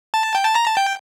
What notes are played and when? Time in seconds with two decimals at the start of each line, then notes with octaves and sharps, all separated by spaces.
0.14 A5
0.35 G5
0.45 A5
0.55 A#5
0.66 A5
0.77 G5